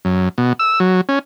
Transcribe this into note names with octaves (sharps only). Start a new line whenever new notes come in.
F#2
B2
E6
F#3
C#4